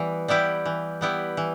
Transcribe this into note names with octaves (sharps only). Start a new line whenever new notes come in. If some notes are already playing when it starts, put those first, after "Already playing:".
Already playing: E3 G3 B3
G3 B3 E4 G4
E3
G3 B3 E4 G4
E3